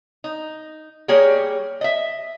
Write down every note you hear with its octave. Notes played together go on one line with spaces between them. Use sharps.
D#4
G3 A#3 G4 G#4 C#5
D#5 E5